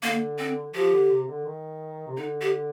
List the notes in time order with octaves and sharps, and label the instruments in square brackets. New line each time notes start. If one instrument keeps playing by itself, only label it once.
[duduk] D3 [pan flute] A#3
[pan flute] C4
[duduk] F3 [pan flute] G4
[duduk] D3
C3
D3
D#3
C3
[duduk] D3 [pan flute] D#4
[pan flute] G4